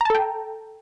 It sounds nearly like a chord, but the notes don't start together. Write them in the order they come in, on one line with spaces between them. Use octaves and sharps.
A#5 A5 A4 G5